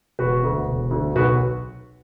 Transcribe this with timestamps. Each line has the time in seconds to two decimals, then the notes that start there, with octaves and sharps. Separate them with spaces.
0.19 E1 F#4 B4
0.43 D2 D3
0.68 E1
0.91 D2 D3
1.16 B1 F#4 B4